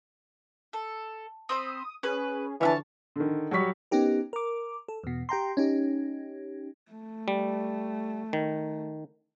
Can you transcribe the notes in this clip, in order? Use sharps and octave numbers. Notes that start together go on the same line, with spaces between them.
A4
C4 C5 B5 D#6
C#4 G#4 B4
D3 E3 F3 D4 C#5 E5 A5
D3 D#3
F#3 G3 C#6 B6
B3 C#4 D#4 G4 A#4
A#4 D6
A4
E2 B2
G4 G5 A#5 C6
C#4 D#4 G4
A3
G3
D#3